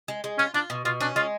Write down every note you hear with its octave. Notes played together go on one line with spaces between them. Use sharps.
G#3
G#3
C#4 F4
D4 F4
B2
B2 F4
C#4 D4
G#3 F4